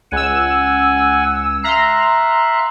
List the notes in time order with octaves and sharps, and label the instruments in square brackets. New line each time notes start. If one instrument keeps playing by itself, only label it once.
[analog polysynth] C#2 E6 [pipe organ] F#5 G#5
[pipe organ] E5 F5 F#6 [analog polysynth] A#5 C6